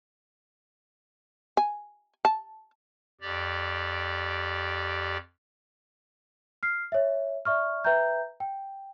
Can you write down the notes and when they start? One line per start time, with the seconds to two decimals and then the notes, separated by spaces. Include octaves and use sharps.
1.57 G#5
2.25 A5
3.21 F2 G4 D5
6.63 F6 C7
6.92 C#5 E5
7.45 D5 E5 C#6 F6
7.84 B4 E5 G5 A#5 G6
8.40 G5